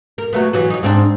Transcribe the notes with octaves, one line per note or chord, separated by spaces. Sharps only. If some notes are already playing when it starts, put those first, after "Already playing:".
A#4
F#3 A3 B3
E3 F#3 F#4
F#3 D#4
G#2 C4 D4